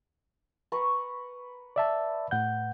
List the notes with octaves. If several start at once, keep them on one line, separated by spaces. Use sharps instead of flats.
B4 A#5 C#6
D5 E5 A5
A2 F#5 G6